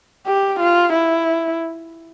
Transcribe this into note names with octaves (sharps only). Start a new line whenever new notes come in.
G4
F4
E4